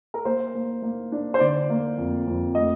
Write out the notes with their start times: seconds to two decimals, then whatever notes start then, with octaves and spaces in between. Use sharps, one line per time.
0.14 A#4
0.25 A#3 C5
0.55 A#3
0.82 A#3
1.12 D4
1.34 C5
1.40 D3 D5
1.70 A#3
1.98 F2
2.27 F2
2.55 A3 D#5